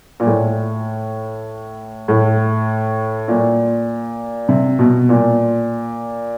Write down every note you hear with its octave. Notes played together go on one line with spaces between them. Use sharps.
A#2
A2
A2
A#2
C3
B2
A#2